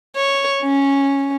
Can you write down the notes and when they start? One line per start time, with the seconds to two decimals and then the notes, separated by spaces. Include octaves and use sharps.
0.16 C#5
0.62 C#4